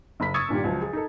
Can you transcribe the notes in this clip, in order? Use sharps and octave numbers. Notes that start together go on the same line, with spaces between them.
F#1 B5 B6
C#6 D#6 E6 G#6 A6 C#7
G2 A#2 D#3 G4
C#2 F3 F#3
G#4
D#4 A4